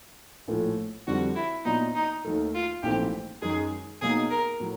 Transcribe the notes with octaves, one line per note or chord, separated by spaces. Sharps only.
A#1 A2 F3 A3
F2 D3 G3 C4 F#4
E4
A#2 F#3 B3 D4 D#4
D#4
D#2 D#3 F#3 A3
F4
A#1 G#2 E3 A3 C4 G4
F#2 D#3 G#3 G#4
B2 F#3 A#3 D#4 G#4
A#4
A2 F#3